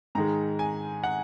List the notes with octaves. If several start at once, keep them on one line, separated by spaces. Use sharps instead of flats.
G#2 D#3 G#3 A#5
G#5
F#5